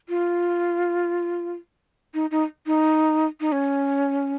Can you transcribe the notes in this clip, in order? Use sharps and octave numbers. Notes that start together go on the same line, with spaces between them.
F4
D#4
D#4
D#4
D#4
C#4